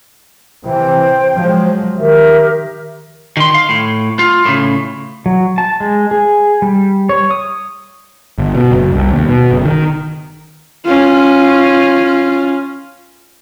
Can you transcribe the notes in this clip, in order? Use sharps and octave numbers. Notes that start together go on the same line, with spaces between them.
C3 E3 C5 G5
F3 F#3 G#3
D#3 G4 A#4 E5
D#3 C6
F5
A2
F4
A2 C#3
F#3
A5
G#3
G#4
G3
C#5
D#6
G1
B2
F#1
C2
D#2
B2
F#1
D#3
C#4 F4